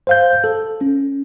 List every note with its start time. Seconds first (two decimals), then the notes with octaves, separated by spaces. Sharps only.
0.07 C5 F5 G6
0.44 A4
0.81 C#4